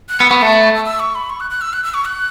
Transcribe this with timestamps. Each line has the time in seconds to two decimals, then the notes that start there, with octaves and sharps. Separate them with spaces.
0.09 F#6
0.20 B3 E6
0.30 B3 C#6
0.41 A3 A5
0.53 B5
0.63 C#6
0.75 E6
0.85 E6
1.00 C#6
1.15 B5
1.30 C#6
1.40 F#6
1.50 F#6
1.61 E6
1.73 F#6
1.84 E6
1.94 C#6
2.05 F#6